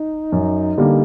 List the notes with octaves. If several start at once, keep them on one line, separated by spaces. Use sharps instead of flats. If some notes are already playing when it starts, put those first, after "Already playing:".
Already playing: D#4
F#2
D3 G3 A#3